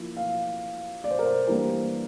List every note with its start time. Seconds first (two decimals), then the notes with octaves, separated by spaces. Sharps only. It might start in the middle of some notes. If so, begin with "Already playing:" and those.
Already playing: F3 A#3 E4
0.16 F5
1.04 D5
1.11 C5
1.19 A#4
1.26 C5
1.47 E3 G3 A#3 D4 A#4